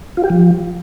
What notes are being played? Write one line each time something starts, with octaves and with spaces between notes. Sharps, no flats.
F4
G4
F3